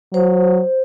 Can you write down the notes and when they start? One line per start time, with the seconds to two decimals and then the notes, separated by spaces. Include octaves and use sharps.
0.13 F#3 C5